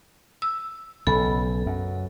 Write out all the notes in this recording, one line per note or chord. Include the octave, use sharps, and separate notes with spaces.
E6
B1 C#3 A4 B5
F#2